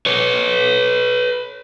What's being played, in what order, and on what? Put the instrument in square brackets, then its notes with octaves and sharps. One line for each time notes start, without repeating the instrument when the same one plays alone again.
[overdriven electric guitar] B4 C#5